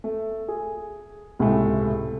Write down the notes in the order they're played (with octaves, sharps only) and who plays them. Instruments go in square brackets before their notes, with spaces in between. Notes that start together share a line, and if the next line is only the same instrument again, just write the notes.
[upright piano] A3
G#4
C#2 A2 C3 G#3 A3